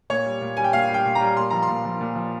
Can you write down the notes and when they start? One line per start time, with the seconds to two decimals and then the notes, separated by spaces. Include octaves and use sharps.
0.10 A#2 C#5
0.26 G3
0.41 A#2
0.57 G3 G#5
0.64 G5
0.73 A#2 F5
0.88 G3
0.94 G5
1.06 A#2
1.15 A#5
1.21 G3
1.37 A#2 C6
1.50 F3 A#5
1.62 C6
1.69 A#2
1.85 F3
2.01 A#2
2.16 F3